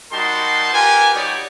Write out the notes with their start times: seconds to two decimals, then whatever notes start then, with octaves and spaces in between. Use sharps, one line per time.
0.12 G3 D#4 F#4 A#4 A5 C6
0.72 F4 G4 A#4 B4 G#5
1.15 G3 D#4 F#4 G4 C#5 D5